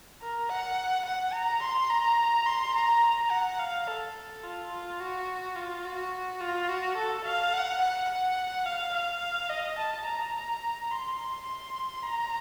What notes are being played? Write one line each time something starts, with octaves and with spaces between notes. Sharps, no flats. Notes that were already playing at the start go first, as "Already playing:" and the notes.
A#4
F#5
F#5
A#5
C6
A#5
C6
A#5
F#5
F5
A4
F4
F4
F#4
F4
F#4
F4
F#4
A4
F5
F#5
F#5
F#5
F5
F5
D#5
A5
A#5
C6
C6
A#5